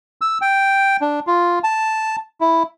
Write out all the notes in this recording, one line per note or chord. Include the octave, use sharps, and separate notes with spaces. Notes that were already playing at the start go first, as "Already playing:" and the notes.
E6
G5
D4
F4
A5
E4